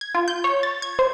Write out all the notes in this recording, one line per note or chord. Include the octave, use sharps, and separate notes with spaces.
G#6
F4
G6
C#5
A6
G#6
C5